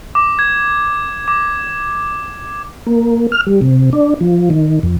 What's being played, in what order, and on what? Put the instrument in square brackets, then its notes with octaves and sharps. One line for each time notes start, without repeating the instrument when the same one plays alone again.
[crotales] D6
G#6
D6
[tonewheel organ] A#3
F6
G3
C3
D4
F3
D#3
F2